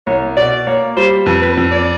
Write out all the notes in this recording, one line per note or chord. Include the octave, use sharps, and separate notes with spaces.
C2 C#5
B2 D5
A#3 C#5
G3 C5
F2 B4
B4
F2
D5